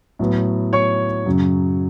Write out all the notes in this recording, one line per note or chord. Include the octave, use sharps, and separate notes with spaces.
A2 F#3 B3
C#5 C#6
F#2 C#3 F#3